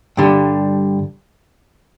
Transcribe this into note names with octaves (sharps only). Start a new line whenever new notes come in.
G2 D3 G3